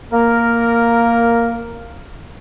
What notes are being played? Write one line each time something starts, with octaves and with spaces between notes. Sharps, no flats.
A#3 A#4